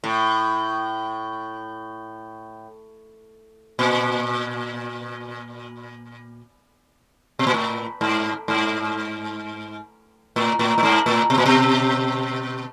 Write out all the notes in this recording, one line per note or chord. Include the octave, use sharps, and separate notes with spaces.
A2
A#2
B2
A#2
A2
G#2
G#2
A2
A2
A2
G#2
A2
B2
A#2
B2